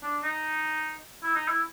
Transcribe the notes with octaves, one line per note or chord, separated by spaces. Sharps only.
D4
D#4
E4
D#4
E4